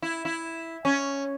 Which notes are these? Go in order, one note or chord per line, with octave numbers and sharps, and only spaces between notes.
E4
E4
C#4